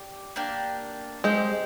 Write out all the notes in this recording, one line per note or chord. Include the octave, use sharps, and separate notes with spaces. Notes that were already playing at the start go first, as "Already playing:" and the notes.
Already playing: G4 D5
A#3 D4 G4
G#3 C4 G4 C5